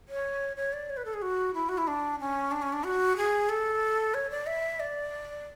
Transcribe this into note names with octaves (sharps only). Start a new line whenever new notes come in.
C#5
C#5
D5
C#5
B4
A4
G#4
F#4
E4
F#4
E4
D4
C#4
D4
C#4
D4
F#4
G#4
A4
C#5
D5
E5
D5